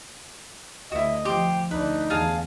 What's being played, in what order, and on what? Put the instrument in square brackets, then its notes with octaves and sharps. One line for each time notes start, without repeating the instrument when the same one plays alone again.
[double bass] D2 [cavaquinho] E4 F#4 [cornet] D#5
[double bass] F3 [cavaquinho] G4 C6
[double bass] D2 D4 [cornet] D#4 [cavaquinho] B4
[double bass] E2 [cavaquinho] G#4 F5 A5